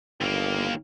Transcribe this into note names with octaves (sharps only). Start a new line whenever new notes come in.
G1 D#2 A#3